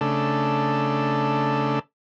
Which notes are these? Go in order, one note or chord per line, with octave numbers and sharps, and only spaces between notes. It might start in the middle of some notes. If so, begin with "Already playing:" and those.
C#3 A3 D4 A4